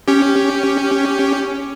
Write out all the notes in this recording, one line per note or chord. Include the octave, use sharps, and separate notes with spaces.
C#4 G4